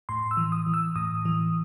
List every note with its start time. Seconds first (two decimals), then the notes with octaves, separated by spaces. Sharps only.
0.09 A2 C6
0.31 E6
0.37 E3
0.52 D#6
0.66 E3
0.74 E6
0.96 A2 D#6
1.25 E3